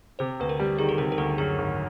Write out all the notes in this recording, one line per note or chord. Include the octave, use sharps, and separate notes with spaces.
C3 C5
D2 B4
A#4
G3
D#3 G#4
A4
C3 A#4
A#4
D2 A4
F#2 G#4
G#1